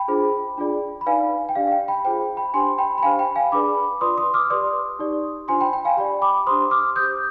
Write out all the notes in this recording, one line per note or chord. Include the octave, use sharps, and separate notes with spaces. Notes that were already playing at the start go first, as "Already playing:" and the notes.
Already playing: G5 B5
D4 F4 G#4 C5
D4 F4 G#4 D5
B5
D#4 B4 D5 F5 G#5
G5
D4 G4 D5 F5
F5
G5
G5 B5
F4 G#4 C5 G5
G5 B5
D4 G4 C5 G#5 C6
G5 B5
B5
D4 G4 C5 F5 G#5
G5 B5
F5 G#5
D4 G#4 B4 D5 B5 D6
F4 B4 D5 C6 D#6
C6 D#6
D6 F6
G4 B4 D5 C6 D#6
D#4 G4 D5
D4 F4 C5 G#5 C6
G5 B5
G5
F5 G#5
G4 D5 G5 B5
B5 D6
D4 G4 C5 C6 D#6
D6 F6
G4 C5 D#6 G6